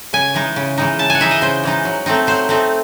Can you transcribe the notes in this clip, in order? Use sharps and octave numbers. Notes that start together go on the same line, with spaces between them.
C#3 G#5
E3 G#3 D#4
C#3
E3 G#3 D#4
C#3 A5
F#5 G#5
E3 G#3 D#4 E5
D#5
C#3 C5
E3 G#3 D#4
F#3
A3 C4 D#4
F#3 C5
A3 C4 D#4